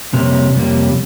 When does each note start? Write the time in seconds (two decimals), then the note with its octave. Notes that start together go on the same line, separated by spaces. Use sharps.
0.13 F2 C3 G3 A#3 C#4
0.55 F2 C3 G3 A#3 C#4